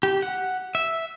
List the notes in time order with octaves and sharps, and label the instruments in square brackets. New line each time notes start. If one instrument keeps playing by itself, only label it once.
[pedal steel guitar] G4
F#5
E5